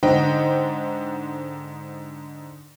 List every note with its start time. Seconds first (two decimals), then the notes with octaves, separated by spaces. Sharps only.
0.03 G#2 D3 C5 D#5 F#5 G5